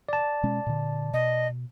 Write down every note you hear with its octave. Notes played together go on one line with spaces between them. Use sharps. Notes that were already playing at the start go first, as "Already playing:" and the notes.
D5 A5
B2 G#3 C#4
A#2 D3
B2 D#5